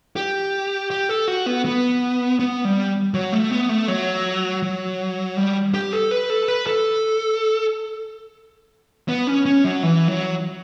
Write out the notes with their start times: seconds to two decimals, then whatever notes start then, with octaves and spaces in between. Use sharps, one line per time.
0.16 G4
0.91 G4
1.09 A4
1.28 F#4
1.46 B3
1.65 B3
2.39 B3
2.65 G3
3.14 F#3
3.32 A3
3.51 B3
3.69 A3
3.88 F#3
4.62 F#3
5.37 G3
5.74 G4
5.92 A4
6.11 B4
6.30 A4
6.48 B4
6.67 A4
9.09 B3
9.27 C#4
9.46 C#4
9.64 F#3
9.83 E3
10.08 F#3